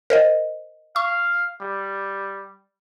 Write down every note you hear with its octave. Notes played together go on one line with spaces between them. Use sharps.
A#4 C5 D#5
F5 C#6
G3